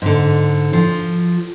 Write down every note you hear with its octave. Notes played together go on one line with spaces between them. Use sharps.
G#2 D3
F3